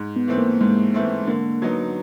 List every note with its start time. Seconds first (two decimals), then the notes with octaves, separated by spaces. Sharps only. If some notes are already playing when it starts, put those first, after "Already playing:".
Already playing: G#2
0.16 B3
0.28 E3 A3 C4
0.38 A#3
0.61 G#2 G#3
0.94 E3 A3 C4
1.27 D3 A#3
1.62 F#3 B3 D#4